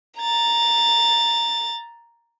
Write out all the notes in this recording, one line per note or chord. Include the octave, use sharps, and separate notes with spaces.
A#5 A6